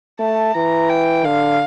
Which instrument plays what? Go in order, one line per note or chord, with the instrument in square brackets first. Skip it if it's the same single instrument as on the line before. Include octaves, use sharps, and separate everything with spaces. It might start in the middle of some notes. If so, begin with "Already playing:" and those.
[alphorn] A3 [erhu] A5
[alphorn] E3 [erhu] A#5
[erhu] G5
[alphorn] D3 [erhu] F5